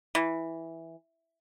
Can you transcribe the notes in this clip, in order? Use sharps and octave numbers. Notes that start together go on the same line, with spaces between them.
E3